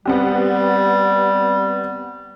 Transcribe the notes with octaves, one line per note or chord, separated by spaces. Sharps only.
G3 B3 C4 G4